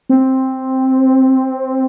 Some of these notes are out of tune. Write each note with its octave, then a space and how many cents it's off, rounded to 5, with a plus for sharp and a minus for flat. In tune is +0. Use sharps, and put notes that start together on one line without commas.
C4 +5